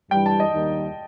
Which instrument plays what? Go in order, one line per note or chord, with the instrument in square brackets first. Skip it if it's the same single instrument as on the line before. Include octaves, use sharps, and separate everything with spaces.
[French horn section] G2 E3 G3 [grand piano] G5
[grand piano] A5
D#5
[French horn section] D#2 D#3 G3 D#4